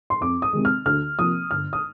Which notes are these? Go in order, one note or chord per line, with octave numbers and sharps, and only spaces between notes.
C6
F2 D6
D#6
C3 D#3 G#3
F6
D2 F6
C3 F3 A#3 D#6
G1 F6
D#6